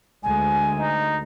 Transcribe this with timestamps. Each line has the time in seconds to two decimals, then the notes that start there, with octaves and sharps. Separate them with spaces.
0.23 D2 G#3 G#5
0.80 D#4